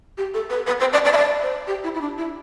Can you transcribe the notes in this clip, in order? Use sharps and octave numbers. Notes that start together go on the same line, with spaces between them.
G4
A4
B4
B4
C5
D5
D5
E5
D5
C5
G4
E4
E4
D4
E4